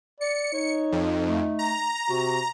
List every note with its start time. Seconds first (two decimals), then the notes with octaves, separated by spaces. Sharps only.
0.21 D5 C#7
0.54 D#4 C#5
0.92 F2
1.26 A3
1.59 A#5
2.10 C3 F#4